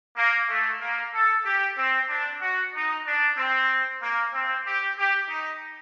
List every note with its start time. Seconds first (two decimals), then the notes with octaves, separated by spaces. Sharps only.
0.17 A#3
0.49 A3
0.81 A#3
1.14 A4
1.45 G4
1.77 C4
2.09 D4
2.41 F#4
2.74 D#4
3.06 D4
3.37 C4
4.02 A#3
4.34 C4
4.67 G4
4.99 G4
5.30 D#4